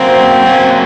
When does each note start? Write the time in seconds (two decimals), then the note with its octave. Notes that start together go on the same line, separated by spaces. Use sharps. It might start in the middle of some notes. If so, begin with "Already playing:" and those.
Already playing: F#3 A#3 C4 C#4
0.46 F#3 A#3 C#4